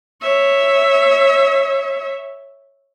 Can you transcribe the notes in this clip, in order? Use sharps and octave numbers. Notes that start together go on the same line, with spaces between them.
C#5 E5